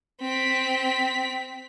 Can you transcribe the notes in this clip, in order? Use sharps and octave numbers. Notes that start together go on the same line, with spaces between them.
C4 B6